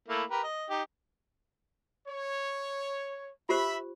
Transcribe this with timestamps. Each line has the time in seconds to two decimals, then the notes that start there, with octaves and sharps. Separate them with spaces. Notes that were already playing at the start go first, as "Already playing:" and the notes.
0.09 A3 A#3 E4
0.30 G4 A#4 B4
0.43 D#5
0.70 D#4 G4
2.07 C#5
3.49 F4 G4 C5 E5 B5